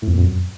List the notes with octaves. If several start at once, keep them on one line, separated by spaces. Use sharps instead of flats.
A2
F2
A#2
F2
F#2